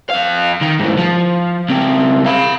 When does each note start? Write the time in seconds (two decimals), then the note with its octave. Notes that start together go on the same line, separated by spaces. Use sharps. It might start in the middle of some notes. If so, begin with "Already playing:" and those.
0.10 F2 F5
0.61 D#3
0.79 G#2 E3
0.97 F3
1.69 C#2 C4
2.26 F5 B5